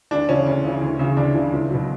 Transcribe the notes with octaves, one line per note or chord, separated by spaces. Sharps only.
D2 D4
C#3 E3 C#4
D2
C#3 E3
D2
C#3 E3
D2 D4
C#3 E3
C#2
B2 F#3